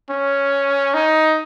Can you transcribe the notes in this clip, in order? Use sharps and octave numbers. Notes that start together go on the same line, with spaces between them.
C#4
D#4